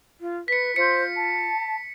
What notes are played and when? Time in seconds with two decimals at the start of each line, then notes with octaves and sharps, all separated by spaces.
0.21 F4
0.48 B4 B6 C#7
0.76 F4 C5 C6 G6 C#7
1.14 A5